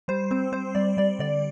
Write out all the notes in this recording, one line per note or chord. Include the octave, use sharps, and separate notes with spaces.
G3 C5
C4 C5
C4 C5
G3 D5
G3 D5
D3 D5